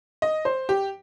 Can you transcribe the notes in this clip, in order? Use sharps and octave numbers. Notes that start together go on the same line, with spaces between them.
D#5
C5
G4